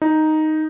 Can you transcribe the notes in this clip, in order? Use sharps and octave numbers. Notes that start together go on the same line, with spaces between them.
D#4